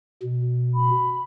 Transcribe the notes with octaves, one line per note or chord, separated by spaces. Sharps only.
B2
B5